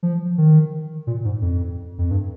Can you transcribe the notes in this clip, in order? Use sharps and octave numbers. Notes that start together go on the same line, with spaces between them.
F3
D#3
A#2
G#2
F2
F2
G2